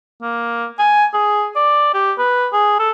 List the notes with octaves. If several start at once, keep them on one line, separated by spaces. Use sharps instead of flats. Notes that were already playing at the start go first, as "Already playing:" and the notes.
A#3
G#5
G#4
D5
G4
B4
G#4
A4